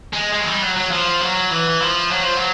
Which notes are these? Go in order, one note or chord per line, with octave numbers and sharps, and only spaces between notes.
G#3
G#3
F#3
G3
F#3
F#3
F3
F#3
E3
F3
F#3
F3
F#3